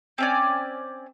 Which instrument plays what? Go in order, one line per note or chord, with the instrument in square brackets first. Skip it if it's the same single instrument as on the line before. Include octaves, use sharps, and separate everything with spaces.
[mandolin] C4 C#4 D5